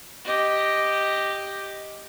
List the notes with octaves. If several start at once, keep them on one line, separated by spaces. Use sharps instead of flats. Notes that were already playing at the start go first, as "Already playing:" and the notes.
G4 D#5